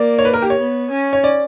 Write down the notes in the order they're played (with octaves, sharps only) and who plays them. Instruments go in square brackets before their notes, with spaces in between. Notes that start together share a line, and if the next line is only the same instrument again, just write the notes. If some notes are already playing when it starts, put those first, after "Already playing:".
Already playing: [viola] A#3 [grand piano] D5
[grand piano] C#5
B4
A#4
G4
C#5
[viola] B3
C#4
[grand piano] C#5
D5